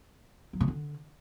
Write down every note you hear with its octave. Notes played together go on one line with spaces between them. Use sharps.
F#3
C#3
D3